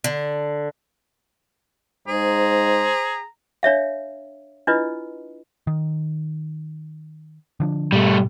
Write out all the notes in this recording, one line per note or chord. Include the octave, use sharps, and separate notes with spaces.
D3
G#2 G#4 C5 A#5
D4 C#5 E5 F5
D4 E4 F4 B4 D#5
D#3
D3 F3 D4
G#2 B2 G3 A3